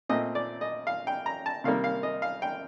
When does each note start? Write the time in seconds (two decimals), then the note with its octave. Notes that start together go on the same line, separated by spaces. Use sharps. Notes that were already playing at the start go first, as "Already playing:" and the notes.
0.09 A#2 A3 C4 D#5
0.35 D5
0.61 D#5
0.87 F5
1.07 G5
1.26 A#5
1.46 A5
1.64 C3 D#3 G3 A#3 F5
1.84 F5
2.03 D#5
2.22 F5
2.42 G5